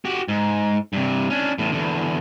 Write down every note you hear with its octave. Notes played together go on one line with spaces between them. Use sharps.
F#4 G4
G#2
G2 C3
C#4 D4
E2 A2
E2 D3